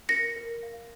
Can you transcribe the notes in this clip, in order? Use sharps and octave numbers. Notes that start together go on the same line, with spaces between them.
A#4 A#6 C#7
A#4
F5